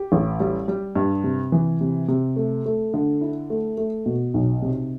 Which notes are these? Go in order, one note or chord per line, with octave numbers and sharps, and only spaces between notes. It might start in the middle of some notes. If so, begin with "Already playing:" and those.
Already playing: G4
A1
G3
G3
G2
C3
E3
C3
C3
A3
A3
D3
E4
A3
A3
B2
B1
C3